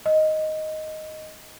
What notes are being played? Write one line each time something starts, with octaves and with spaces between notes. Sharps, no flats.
D#5